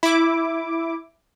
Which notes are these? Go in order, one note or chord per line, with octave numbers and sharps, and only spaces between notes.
E4 D6